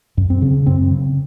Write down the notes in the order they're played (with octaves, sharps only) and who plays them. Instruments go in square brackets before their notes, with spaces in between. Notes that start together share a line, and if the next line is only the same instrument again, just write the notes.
[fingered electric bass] F#2
C4
C#3
F#2 C4
C#3